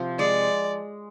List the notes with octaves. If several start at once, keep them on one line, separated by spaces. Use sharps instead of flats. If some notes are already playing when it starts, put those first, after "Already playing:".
Already playing: C3 F3
G#3 D5